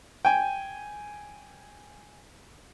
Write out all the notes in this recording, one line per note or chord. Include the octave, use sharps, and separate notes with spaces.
G5 G#5